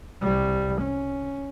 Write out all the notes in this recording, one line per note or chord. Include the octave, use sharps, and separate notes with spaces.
C2 G3
C#4